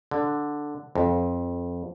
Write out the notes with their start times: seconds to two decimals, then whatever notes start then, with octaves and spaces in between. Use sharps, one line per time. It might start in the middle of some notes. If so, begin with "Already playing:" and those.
0.11 D3
0.95 F2